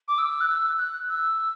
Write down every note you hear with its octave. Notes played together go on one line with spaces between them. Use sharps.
D6
E6
F#6
E6
F#6
E6